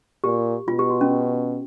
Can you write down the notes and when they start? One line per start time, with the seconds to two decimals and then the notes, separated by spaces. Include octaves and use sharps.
0.24 A#2 G4
0.68 B2 F4
0.79 G4
0.90 F#4
1.01 C#4